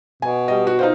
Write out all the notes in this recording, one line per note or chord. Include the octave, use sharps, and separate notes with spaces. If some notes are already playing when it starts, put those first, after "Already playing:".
B2 G#5
G3 D#5
F#4
D#4 F4 C5